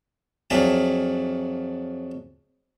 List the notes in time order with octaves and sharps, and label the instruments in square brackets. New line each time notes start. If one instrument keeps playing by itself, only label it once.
[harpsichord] F2 F#3 D4 G#4 E5 F5